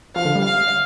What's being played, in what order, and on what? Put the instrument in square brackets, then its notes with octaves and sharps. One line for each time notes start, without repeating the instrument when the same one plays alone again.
[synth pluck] F3 [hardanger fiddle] F5
[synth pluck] D3
G3
[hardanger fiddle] F5